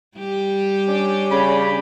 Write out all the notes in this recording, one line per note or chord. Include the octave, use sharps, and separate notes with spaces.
G3 G4
C#4 D4 D5
C#3 B5